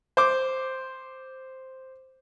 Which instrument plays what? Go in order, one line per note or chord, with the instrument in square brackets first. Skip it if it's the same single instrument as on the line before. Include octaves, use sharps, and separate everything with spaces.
[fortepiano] C5 D6